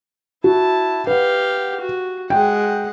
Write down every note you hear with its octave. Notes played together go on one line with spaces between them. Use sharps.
E4 F#4 A5
G4 B4 F5 F#5
F#4
G#3 F#5 G5